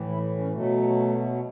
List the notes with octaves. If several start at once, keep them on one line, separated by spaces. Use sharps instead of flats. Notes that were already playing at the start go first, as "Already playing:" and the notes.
Already playing: A2 E3
E4
C#4
B2 F#3 A3